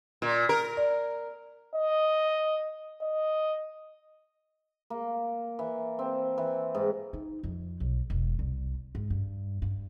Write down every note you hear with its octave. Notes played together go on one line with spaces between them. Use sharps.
A#2
A#4
D5
D#5
D#5
A#3
E3
C4
E3
G#2
D#4
F2
B1
E1
C2
G#2
G2
G2